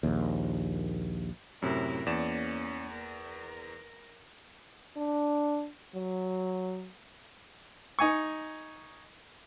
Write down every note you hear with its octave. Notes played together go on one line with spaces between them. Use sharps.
A#1 D#2
F#2 A2 C3 E4 A#4
E2 A#3 C#4 D5 E7
A#4
D4
F#3
D#4 G#5 C#6